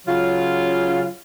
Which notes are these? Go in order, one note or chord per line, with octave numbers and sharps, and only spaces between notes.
C#3 F#3 F4